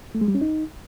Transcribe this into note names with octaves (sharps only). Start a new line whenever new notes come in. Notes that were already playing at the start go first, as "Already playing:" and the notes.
A3
G#3
G3
C#4
D#4